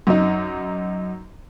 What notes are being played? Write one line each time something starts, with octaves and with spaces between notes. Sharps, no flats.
F#2 D#4